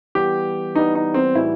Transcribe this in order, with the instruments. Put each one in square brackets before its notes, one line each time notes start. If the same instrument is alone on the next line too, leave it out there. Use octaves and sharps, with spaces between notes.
[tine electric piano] E3 G3 B3 [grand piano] G4
[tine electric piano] E3 G3 B3 [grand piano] D#4
[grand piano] D#4
C4
[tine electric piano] A2 E3 G3 D#4 F#4 [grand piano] E4